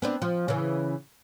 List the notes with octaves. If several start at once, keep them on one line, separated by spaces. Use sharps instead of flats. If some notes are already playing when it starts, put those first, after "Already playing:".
B3 C4 D4
F3
C#3 E3